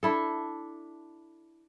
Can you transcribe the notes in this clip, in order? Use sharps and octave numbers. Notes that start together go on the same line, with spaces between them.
D4 E4 A4